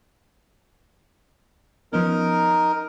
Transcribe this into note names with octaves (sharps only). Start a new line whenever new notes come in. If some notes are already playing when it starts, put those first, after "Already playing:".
F3 B3 C#4 D#4 A#4